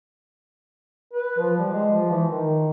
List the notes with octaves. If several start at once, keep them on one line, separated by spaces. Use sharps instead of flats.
B4
F3
G3
G#3
F3
E3
D#3